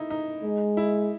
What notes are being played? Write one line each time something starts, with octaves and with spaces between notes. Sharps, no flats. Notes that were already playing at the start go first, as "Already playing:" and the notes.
Already playing: D#4 E4
D#4
G#3
E4